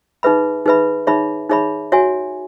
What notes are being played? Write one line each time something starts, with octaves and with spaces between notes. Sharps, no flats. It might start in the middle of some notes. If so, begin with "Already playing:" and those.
D#4 G#4 B4 E5 B5
D#4 G#4 B4 E5 B5
D#4 G#4 C#5 E5 B5
D#4 G#4 C#5 E5 B5
F#4 C#5 E5 G#5